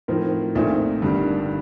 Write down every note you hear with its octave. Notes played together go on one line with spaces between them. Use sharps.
A2 F3 C4 D#4 A#4
A#1 A#2 A3 C4 D#4
G1 G2 D#3 G3